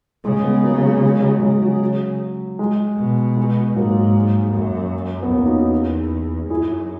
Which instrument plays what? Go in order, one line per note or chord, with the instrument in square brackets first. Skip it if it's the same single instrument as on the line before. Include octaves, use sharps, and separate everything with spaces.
[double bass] C#3 [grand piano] G#3
[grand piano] G#3 B3
F#3 A#3
G#3
G#3
F#3
[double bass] C#3 [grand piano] G#3
[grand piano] F#3
G#3
[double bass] B2
[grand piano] G#3
[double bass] G#2 [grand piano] F#3 A#3
[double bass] F#2
[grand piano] B3
[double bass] E2 [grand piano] A#3 C#4
[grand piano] D#4 F#4
[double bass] F#2 [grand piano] E4 G#4